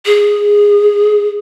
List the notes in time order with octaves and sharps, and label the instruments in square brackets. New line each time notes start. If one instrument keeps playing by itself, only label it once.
[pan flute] G#4